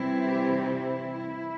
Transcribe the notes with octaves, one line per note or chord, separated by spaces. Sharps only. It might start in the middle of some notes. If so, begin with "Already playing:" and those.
Already playing: C3 E3 G3 C4 E4
G4
E4